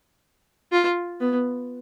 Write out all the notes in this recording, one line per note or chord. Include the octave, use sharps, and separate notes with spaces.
F4
B3